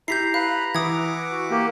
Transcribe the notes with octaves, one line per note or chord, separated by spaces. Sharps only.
E4 G4 A#5 G6 B6 C7
B4 F5 B5
E3 E5 F#5 D6 D#6 G#6
F#4
A#3 G4